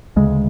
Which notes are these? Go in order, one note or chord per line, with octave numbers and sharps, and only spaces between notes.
D2 C#3 G#3